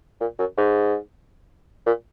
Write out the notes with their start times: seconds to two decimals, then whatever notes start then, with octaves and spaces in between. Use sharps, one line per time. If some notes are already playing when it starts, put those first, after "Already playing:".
0.21 A#2
0.39 F#2
0.57 G#2
1.86 A#2